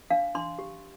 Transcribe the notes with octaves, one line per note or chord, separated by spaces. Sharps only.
D4 F5
D4 C6
G4